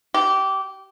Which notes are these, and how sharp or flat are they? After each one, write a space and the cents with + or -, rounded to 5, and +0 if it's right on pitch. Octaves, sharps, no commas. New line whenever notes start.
G4 -20